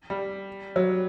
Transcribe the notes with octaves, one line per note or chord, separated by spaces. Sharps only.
G3
F#3